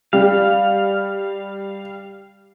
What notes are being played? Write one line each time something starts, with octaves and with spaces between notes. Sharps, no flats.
G3 F5